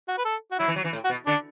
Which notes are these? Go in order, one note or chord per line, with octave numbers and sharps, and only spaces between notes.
F#4
B4
A4
F#4
F#3 E4
E3
F#3
E3
A2
F#4
B2
D3 D4